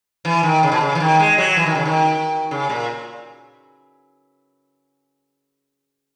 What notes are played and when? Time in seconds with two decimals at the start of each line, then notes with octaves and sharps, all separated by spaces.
0.25 E3
0.43 D#3
0.63 C#3
0.72 B2
0.81 C#3
0.95 E3
1.00 D#3
1.20 G#3
1.38 F#3
1.56 E3
1.66 D#3
1.75 C#3
1.85 D#3
2.51 C#3
2.70 A#2